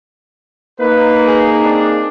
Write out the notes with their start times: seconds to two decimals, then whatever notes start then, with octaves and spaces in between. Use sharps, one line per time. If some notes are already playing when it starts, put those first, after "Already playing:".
0.80 A#3 D#4 B4
1.27 G#4
1.62 C4 D4